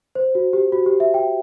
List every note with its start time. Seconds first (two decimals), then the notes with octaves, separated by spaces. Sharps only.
0.15 C5
0.35 F#4
0.53 G4
0.72 F#4
0.86 G4
1.00 E5
1.14 G5